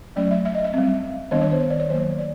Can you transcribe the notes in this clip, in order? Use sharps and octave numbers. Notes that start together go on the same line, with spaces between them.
F#3 A3 C#4 D5
E5
E5
D#5
E5
G3 C4
D#3 G3 B3 D4 D#5
C#5
C5
C#5
D5
C#5
D#3 F#3 A#3 C5
D5